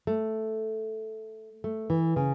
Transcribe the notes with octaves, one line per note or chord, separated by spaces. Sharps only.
A3
A3
E3
C#3